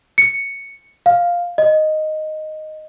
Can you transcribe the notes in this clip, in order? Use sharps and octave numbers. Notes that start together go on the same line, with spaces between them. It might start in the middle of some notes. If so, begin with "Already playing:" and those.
C#7
F5
D#5